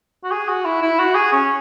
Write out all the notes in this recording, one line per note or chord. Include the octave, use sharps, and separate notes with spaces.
F#4
G#4
F#4
E4
E4
F#4
G#4
C#4